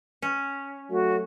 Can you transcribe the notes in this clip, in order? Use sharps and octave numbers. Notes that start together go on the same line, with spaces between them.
C#4
F#3 A3 F#4 A4